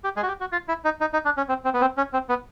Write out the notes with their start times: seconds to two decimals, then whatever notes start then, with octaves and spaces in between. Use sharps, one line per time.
0.04 G4
0.16 G#3 G#4
0.23 F#4
0.28 G4
0.40 F#4
0.52 F4
0.68 E4
0.85 D#4
1.01 D#4
1.13 D#4
1.25 D4
1.37 C#4
1.49 C4
1.65 C4
1.74 B3
1.81 C4
1.97 C#4
2.13 C4
2.29 B3